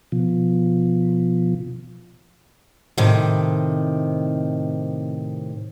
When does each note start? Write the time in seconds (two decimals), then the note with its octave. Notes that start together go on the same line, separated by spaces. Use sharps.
0.12 B2 F3
2.98 A2 C3 D#3